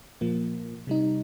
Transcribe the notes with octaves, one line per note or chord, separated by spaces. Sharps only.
A#2 F3 A#3
C3 G3 D#4